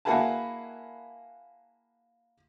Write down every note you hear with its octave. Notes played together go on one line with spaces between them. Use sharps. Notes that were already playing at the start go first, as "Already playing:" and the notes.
A#3 E4 F#4 G#4 B4 A5